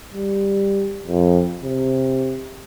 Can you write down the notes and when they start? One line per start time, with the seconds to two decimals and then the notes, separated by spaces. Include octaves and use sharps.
0.14 G3
1.07 F2
1.63 C3